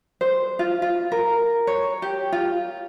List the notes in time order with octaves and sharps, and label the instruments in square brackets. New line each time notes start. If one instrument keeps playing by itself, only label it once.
[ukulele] C5
F4
F4
A#4
C#5
G4
F4